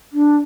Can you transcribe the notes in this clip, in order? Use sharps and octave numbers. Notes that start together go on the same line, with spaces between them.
D4